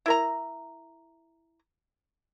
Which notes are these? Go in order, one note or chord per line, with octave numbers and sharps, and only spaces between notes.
E4 A#4 A#5